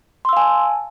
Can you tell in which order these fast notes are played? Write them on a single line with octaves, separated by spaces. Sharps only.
C6 E6 F5 G#5 A5